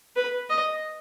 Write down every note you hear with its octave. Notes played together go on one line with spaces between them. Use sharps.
B4
D#5